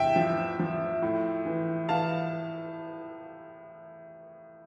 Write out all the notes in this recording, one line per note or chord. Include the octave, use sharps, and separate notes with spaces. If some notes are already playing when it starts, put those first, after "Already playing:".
Already playing: E2 C3 E5 G5
F3
F3
A2
E3
E3 F5 A5